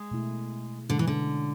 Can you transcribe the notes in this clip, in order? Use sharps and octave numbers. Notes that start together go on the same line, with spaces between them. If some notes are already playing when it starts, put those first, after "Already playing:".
Already playing: G#3
B2 A3 E4
B2 D3 G#3 C#4
E3
D3